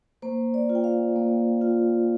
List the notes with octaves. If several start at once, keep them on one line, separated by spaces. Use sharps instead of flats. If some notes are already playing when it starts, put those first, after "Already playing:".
A#3 C5
D5
F4
G5
F5
A#3
F4